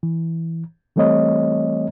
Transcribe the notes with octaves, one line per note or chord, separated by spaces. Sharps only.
E3
E3 G3 A3 C4 C#5 D#5